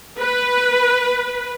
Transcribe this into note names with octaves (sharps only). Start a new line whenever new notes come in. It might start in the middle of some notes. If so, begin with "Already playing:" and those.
B4